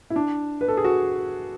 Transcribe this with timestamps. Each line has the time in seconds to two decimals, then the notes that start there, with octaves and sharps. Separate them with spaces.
0.10 E4
0.16 D4
0.61 B4
0.68 A4
0.77 G#4
0.84 F#4